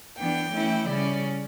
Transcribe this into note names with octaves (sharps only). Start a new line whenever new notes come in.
E3 B3 D4 G5
E3 A3 C#4 E4
C#3 G3 C#4 D5